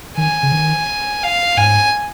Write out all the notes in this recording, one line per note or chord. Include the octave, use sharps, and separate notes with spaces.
D#3 G#5
C#3
D#3
F5
G#2 G#5